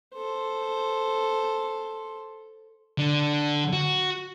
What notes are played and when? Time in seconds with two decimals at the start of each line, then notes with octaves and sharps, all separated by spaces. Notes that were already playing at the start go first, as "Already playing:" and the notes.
0.14 A4 C5
2.98 D3
3.73 F#4